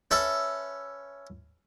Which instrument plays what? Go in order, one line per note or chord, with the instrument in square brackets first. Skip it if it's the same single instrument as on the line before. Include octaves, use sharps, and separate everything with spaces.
[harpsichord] C#4 A4 B4 E5